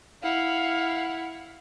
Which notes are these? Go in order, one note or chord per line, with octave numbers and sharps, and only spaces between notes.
E4 F5 F#5